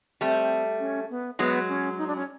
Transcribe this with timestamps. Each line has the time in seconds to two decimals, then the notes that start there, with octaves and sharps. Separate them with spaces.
0.21 G3 A3 C4
0.80 C#4
1.10 B3
1.39 F#3 G#3 B3
1.69 C#4
1.98 D#4
2.07 D4
2.16 C#4